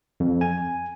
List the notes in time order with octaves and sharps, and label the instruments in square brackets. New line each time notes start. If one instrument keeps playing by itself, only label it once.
[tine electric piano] F2
G#5